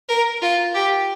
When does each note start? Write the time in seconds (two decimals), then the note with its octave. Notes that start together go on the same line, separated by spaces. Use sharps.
0.09 A#4
0.42 F4
0.74 G4